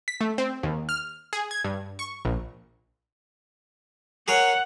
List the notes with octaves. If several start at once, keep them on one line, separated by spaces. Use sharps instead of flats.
B6
A3
C4
D#2
F6
G#4
G#6
G2
C#6
A#1
G#4 A#4 C#5 F#5